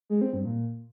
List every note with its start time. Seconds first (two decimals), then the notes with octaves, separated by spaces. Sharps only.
0.10 G#3
0.21 C4
0.33 G2
0.45 A#2